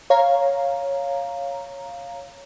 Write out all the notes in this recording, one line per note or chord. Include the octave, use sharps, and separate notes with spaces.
C#5 F5 A#5